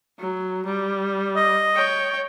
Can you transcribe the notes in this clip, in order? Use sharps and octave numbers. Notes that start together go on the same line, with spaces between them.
F#3
G3
D#5
C#5 G5